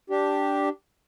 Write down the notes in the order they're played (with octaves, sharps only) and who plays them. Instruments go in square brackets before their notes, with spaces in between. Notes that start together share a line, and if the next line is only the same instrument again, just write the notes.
[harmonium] D4 G4